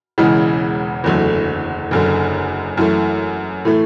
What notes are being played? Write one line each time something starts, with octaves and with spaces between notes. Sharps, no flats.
E1 E2 C#3 E3 G#3
F#1 E2 D3 F#3 A3
F#1 F#2 D3
F#2 E3 A3
A2 E3 A3